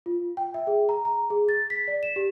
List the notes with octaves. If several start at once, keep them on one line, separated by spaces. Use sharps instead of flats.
F4
G5
E5
G#4
A#5
A#5
G#4
A6
B6
D5
E7
G4